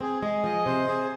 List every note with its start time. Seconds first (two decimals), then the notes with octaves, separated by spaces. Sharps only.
0.01 C4 G#4
0.22 G#3 G#4
0.44 F3 D#5
0.66 C3 C5
0.88 C3 G#4